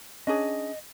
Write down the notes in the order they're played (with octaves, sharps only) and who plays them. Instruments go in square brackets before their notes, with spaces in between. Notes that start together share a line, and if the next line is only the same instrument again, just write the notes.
[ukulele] C#4 D4 G#4 [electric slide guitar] D#5